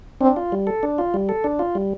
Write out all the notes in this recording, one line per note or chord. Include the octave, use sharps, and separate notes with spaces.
C4 D4
F4
G3
A4
D4
F4
G3
A4
D4
F4
G3